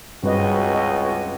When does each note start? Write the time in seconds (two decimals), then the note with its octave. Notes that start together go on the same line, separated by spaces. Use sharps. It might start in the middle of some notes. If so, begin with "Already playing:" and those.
0.24 C#2 G2 C4 F#4 B4 D#5
0.75 D#5